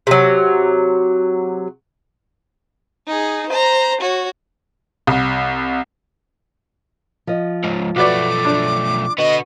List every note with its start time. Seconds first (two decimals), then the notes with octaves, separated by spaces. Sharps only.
0.07 C3 F#3
3.07 D#4 G#4
3.49 C5 A#5
4.01 F#4 C#5
5.07 C2
7.27 F3 D#5
7.64 C#2 G#2
7.96 B1 A3 F#4 B4 D5 D6
8.45 D4
9.18 D3 B3 F#4 D#5